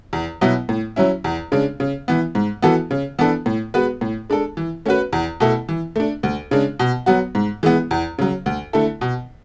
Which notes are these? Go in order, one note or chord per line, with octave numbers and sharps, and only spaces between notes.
E2
B2 F#3 B3 E4
A2
F#3 C#4 E4
E2
C#3 G#3 D4
C#3
E3 B3
G#2
E3 B3 F#4 A4
C#3
E3 B3 D4 A4
A2
G#3 B3 F#4 B4
A2
G#3 D4 A4
E3
A3 C#4 F#4 B4
E2
B2 A3 E4 A4
E3
A3 D4
D2
C#3 G#3 D4
B2
F#3 B3 F#4
G#2
E3 G#3 B3
E2
C#3 F#3
D2
D3 A3 E4 A4
B2